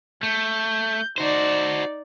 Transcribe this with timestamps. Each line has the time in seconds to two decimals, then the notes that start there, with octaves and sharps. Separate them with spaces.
0.23 A3 G6
1.18 D#4 F#4 C5 D5